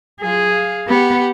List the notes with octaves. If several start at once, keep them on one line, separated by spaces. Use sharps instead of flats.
F#3 F4 G#4
F5
B3 G4 F#5